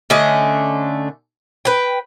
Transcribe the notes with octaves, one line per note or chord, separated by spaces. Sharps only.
D3 A3 C#4 D#5
B4 G5